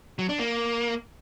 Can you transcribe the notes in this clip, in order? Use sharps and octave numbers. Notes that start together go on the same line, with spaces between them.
F#3
D4
A#3